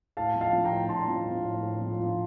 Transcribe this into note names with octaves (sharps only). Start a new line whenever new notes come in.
A2 F5 A5
F3
F5 A5
F3
G5 A#5
A2
A2 A5 C6
F3
F3
A2
A2
F3
F3